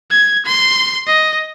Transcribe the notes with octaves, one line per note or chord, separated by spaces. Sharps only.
G#6
C6
D#5